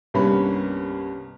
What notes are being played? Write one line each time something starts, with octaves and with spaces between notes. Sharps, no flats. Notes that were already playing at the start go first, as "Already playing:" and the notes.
C2 G2 A#3 B3 C#4 B5